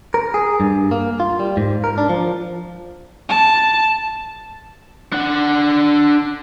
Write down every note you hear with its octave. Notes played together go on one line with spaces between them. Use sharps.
A#4
G#4
G2
A#3
F4
G3
G#2
A#4
D4
F3
A5
D4 F#5